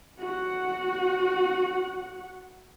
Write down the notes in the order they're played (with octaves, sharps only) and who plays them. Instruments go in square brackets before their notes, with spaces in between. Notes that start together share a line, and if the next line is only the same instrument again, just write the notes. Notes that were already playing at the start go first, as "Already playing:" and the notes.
[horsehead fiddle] F#4 F#5